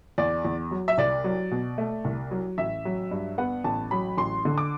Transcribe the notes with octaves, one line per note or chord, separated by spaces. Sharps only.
E2 D5
E2
F#3
E5
C2 D5
F#3
B2
A3
C2
F#3
A1 E5
F#3
G2
B3 F#5
A1 A5
F#3 B5
A1 C6
D3
D6